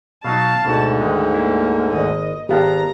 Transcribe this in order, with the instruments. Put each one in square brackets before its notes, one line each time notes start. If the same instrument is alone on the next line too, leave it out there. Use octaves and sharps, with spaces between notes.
[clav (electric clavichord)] B2 F#3 D#4 [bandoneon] F5 [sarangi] A5
[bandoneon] D2 G#2 D3 [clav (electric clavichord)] B2 F#4
[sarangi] D#3 [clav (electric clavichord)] G#3
[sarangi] A#3 [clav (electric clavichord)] E4
[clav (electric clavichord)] G#1 [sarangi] D#5
[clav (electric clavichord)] G#1 B3 [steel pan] G4 F5 A5 [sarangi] A#5